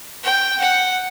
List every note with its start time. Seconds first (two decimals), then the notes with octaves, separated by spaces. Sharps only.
0.23 G5
0.60 F#5